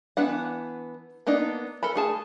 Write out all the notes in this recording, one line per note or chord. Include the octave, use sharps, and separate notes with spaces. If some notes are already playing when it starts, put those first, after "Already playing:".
E3 B3 D4 F#5
A#3 B3 D4 D#4
A4 A#4 B5
A3 G#4 A5